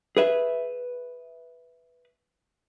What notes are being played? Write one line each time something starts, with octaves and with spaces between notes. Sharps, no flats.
G#4 B4 E5